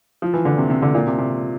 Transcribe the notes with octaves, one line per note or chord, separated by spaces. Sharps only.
F3
E3
D3
C3
C3
D3
A#2
C3
C3